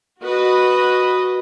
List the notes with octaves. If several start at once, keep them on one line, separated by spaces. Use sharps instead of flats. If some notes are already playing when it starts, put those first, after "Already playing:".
F#4 B4 D#5